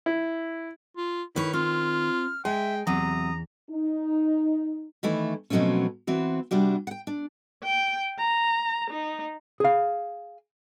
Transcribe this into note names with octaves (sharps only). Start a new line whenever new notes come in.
E4
F4
D#3 E4 B4 C#5
C4 F4 F6
G#3 E5 G5 G#5
E2 C3 F#3 A#5 D#6
D#4
D#3 E3 A3 E4
B2 F3 F#3 A3 C4 C#4
E3 C4 F#4
C3 G3 D4 F#4
F#5 G5
D4
G5
A#5
D#4
G#4 F5